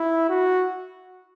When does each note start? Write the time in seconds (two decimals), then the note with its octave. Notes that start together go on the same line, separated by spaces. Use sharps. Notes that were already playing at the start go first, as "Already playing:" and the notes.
Already playing: E4
0.29 F#4